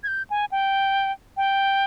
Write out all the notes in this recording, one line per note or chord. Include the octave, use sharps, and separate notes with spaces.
G#6
G6
G#5
G5
G5